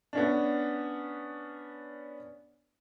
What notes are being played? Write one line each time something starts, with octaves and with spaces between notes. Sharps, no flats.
B3 C#4 D4